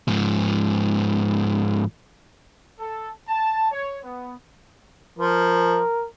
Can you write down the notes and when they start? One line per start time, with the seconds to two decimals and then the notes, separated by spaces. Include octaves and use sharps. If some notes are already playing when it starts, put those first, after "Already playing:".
0.08 G#2 F3
2.79 A4
3.28 A5
3.71 C#5
4.03 B3
5.19 F3 A#4